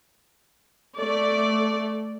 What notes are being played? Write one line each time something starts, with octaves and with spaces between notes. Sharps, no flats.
A3 D5